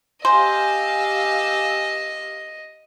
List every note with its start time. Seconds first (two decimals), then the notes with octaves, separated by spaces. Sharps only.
0.25 G4 C5 D#5 F5 G#5 E6